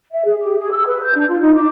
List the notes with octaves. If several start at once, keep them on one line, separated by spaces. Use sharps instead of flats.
E5
G#4
G4
G#4
E6
B4
G6
D4
F4
D#4
D6